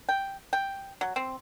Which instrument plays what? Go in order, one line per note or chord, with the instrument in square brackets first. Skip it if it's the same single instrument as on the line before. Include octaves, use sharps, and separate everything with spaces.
[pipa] G5
G5
F#3
C4